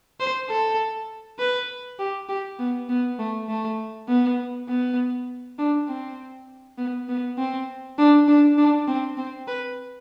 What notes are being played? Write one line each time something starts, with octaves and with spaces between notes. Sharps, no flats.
C5
A4
B4
G4
G4
B3
B3
A3
A3
B3
B3
D4
C4
B3
B3
C4
D4
D4
D4
C4
C4
B4